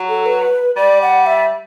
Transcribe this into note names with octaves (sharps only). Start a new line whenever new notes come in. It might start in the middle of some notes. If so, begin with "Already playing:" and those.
Already playing: F#3
A4
B4
G3 D5
F#5
E5